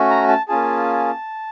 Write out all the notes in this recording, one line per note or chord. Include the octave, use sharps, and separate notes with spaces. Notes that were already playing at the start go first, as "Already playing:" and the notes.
Already playing: A3 C#4 F#4
A#5
A5
A#3 C#4 F4 G#4 A5